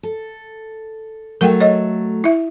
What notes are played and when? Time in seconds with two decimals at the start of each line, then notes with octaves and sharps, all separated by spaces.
0.03 A4
1.41 F#3 A3 A#4 F#5 G5
1.60 C#5 D#5
2.24 E4 E5